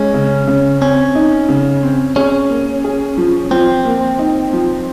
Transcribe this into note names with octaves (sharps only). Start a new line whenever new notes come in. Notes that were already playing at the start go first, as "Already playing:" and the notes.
Already playing: G#3 C#4
C#3
C#3
C4 C#4
D#4
C#3
C4
C#4 G#4
A#3
G#4
F3
F3 C4
A#3
D#4
F3